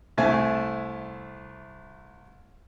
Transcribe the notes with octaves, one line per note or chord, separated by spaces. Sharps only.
C2 A3 E5 G#5 A5